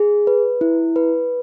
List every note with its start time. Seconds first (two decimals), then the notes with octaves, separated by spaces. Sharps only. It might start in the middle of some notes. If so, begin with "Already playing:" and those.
Already playing: G#4
0.27 B4
0.61 E4
0.96 B4